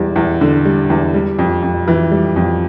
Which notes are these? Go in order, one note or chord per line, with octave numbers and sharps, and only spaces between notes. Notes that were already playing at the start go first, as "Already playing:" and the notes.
Already playing: E2 G3
E2
D3
G3
E2
G3
F2
F2
E3
G3
F2